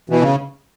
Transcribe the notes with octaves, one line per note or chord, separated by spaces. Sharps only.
B2 E3
C#3